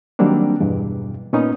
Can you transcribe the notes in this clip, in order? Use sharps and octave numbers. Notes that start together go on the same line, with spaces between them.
D#3 F#3 G3 A#3 C4 D4
E2 G2 B2
A#2 B3 C#4 D#4